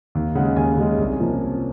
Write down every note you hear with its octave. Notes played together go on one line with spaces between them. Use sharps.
D#2
C#3 G#3 F#5
D#2 G#5
C#3 G#3
C2
C3 F3 A#3 C#4